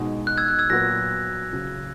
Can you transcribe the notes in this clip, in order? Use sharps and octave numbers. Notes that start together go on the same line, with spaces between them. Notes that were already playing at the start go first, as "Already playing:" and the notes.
Already playing: B2 G#3 D#4 F#4
F#6
E6 G#6
F#6
E6 G#6
A#2 F#3 B3 F#4 F#6 A#6
C#3 F#3 C#4 F#4